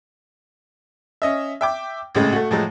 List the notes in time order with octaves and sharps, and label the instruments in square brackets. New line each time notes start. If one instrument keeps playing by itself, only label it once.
[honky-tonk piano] C#4 D#5 E5
E5 G5 D6
G#1 A2 C#3 G#3
A3 F#4
A2 F3 F#3 G#3